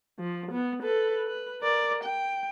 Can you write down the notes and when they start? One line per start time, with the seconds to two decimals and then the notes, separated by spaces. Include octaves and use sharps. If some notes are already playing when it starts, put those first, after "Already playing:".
0.19 F3
0.52 B3
0.83 A4 B4
1.27 B4
1.62 A#4 D5
2.04 G5